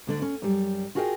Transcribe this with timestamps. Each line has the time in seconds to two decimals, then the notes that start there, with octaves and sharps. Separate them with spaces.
0.07 D2 D3 D4
0.22 C#4
0.42 F#2 G3
0.95 F4 F#4 G#4 A#4 F#5 G5